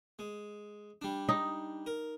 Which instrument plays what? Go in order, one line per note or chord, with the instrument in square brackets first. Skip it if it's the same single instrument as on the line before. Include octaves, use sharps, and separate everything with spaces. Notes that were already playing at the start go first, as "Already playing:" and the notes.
[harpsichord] G#3
G3 D4
[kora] D#4
[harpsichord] A#4